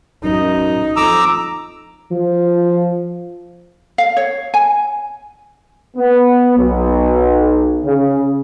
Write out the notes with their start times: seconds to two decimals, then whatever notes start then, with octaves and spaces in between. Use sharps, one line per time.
0.24 F#2 D#4
0.97 F2 A#5 D6 E6
2.12 F3
3.98 F5
4.17 C#5
4.54 G#5
5.97 B3
6.58 B1
7.85 C#3